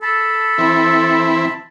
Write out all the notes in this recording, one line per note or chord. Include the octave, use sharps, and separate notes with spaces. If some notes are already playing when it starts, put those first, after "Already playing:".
A4 A5 B5
E3 C4 E4